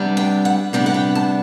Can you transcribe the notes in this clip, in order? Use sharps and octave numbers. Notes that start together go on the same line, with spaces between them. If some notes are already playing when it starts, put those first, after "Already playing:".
Already playing: C3 G3 B3 D4
G5
F#5
C3 G3 B3 D4 G5
F#5
G5
A5